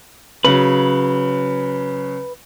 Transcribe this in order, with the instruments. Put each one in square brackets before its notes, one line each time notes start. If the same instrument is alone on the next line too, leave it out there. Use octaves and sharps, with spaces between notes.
[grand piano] C#3 F#3 [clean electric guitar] B4